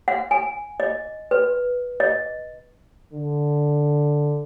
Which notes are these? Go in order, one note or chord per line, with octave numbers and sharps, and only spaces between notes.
F#5
G#5
D#5
B4
D#5
D3